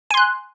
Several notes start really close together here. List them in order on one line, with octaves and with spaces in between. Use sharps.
G#5 C6 F#6